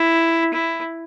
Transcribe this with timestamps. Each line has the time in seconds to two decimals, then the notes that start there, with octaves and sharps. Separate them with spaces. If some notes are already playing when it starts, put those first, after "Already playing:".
Already playing: E4
0.53 E4